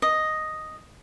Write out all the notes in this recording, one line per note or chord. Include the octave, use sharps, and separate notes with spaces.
D#5